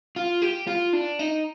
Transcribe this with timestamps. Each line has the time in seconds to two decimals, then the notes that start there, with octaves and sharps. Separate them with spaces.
0.16 F4
0.42 G4
0.67 F4
0.93 D4
1.19 D#4